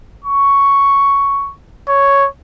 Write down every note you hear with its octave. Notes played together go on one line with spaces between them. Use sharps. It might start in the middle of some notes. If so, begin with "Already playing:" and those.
C#6
C#5